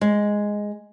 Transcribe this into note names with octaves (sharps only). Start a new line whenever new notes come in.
G#3